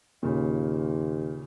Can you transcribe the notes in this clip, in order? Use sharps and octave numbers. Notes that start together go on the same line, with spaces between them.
D#2 A#2 C#3